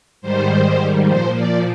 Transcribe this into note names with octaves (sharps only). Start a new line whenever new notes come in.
G#2 D#3 G3 C5
A#2 F3 C5
D5